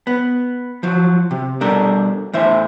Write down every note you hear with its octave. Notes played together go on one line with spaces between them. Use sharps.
B3
F3 F#3
C3
B2 G3 D4 A4 A#4
A2 E3 C5 E5